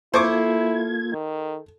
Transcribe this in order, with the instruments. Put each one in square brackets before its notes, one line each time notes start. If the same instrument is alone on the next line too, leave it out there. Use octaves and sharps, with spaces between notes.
[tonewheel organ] A#3 F4 G#6 [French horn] E4 [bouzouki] A4 [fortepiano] C5 C#6 D6
[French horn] D#3